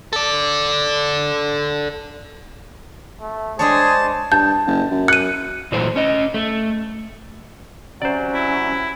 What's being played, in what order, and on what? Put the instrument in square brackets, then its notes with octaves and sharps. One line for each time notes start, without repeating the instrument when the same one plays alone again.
[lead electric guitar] A4 D5
[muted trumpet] A3
[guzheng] G#3 D4 C#5 [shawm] G#4 [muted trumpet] C5 [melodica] A5
[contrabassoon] G2 [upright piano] A5 [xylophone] G6
[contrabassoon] F#1
F#2
[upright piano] F#6 [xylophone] C#7 D#7
[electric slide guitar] A#2 E3 F#3 A3 C5
C#4 D#5
A3
[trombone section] C3 F#3 [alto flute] C#4 [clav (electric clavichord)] C5 D5
[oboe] E4